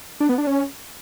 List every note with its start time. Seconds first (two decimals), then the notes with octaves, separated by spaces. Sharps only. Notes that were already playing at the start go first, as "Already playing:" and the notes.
0.20 D4
0.29 B3
0.38 D4
0.47 C#4